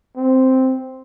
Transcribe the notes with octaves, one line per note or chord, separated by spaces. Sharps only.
C4